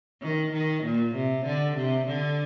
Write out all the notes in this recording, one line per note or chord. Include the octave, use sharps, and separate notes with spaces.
D#3
D#3
A#2
C3
D3
C3
D3